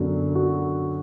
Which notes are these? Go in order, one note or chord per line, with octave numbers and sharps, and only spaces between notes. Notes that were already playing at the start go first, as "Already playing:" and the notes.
Already playing: F#2 D3 F#3 B3
F#4